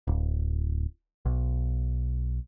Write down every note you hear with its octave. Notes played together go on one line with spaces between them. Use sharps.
D1
B1